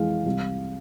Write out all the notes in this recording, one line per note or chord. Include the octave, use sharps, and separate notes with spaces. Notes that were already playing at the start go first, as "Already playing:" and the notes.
Already playing: F2 E3 G#3 F5
C2